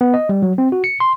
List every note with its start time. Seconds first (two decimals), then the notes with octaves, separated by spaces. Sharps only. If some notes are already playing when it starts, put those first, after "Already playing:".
0.01 B3
0.14 D#5
0.29 G3
0.42 F#3
0.58 C4
0.72 F#4
0.84 C#7
1.00 C6